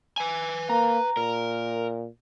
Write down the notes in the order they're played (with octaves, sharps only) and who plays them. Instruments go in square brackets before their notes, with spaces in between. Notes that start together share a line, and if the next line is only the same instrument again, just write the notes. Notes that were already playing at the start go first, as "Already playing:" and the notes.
[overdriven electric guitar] B4 G#5
[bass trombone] A#3 [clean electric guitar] A#5
[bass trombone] A#2 [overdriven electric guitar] A#4